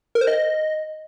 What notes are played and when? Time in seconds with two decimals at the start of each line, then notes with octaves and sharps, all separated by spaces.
0.15 A#4
0.21 C5
0.27 D#5